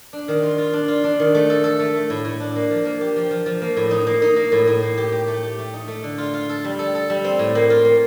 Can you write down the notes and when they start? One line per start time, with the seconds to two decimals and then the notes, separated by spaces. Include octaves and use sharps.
0.13 D4
0.28 D#3
0.43 F4
0.58 F4
0.73 D4
0.88 F4
1.04 D4
1.20 D#3
1.35 A3
1.50 A4
1.64 A4
1.80 A3
1.95 A3
2.10 A2
2.25 A2
2.40 D4
2.56 A#3
2.70 F3
2.85 A#3
3.01 G4
3.16 F3
3.31 F3
3.46 F3
3.62 A#3
3.77 A2
3.91 D#4
4.07 A#3
4.22 D#4
4.36 A#3
4.52 A2
4.67 A2
4.83 A#3
4.97 G4
5.12 G4
5.28 A3
5.43 G4
5.58 A3
5.74 D#4
5.88 A3
6.04 D3
6.18 F4
6.34 F4
6.49 A4
6.65 G3
6.79 A4
6.95 A4
7.10 G3
7.24 C4
7.39 A2
7.55 A#3
7.70 F4
7.85 A#3